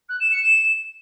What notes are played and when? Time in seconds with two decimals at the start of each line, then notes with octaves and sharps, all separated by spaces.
0.09 F#6
0.20 E7
0.31 C#7
0.43 E7